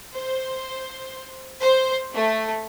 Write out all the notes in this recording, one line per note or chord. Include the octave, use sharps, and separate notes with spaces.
C5
C5
A3